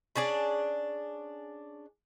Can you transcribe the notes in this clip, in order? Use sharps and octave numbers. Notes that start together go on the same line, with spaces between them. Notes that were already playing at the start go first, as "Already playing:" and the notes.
C#4 D4 G#4 D5